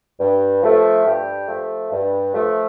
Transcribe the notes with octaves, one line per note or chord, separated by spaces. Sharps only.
G2
F3 A3
G2 G4
F3 A3
G2
F3 A3